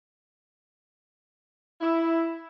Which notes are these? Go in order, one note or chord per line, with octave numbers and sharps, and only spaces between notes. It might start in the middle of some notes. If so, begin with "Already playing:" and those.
E4